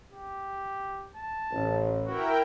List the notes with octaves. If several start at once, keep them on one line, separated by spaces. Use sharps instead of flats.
G4
A5
A1
E4 F#4 A#4 G5